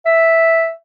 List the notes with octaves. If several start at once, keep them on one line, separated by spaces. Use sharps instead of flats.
E5